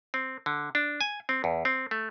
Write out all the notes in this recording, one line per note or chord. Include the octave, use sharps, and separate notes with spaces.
C4
D3
D4
G#5
C4
E2
C4
A3